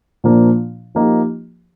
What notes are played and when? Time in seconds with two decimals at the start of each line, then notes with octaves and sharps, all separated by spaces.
0.24 A#2 F3 A#3 D4
0.95 F3 A#3 D#4 G4